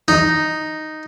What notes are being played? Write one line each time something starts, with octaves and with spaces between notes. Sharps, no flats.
D#4